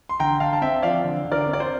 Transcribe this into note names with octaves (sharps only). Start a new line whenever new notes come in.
C6
D3 G5 A#5
D3 F5 A5
A5
C4 E5 G5
F3 D5 F5
D3
D3
A#4 D5
C4
D5
C5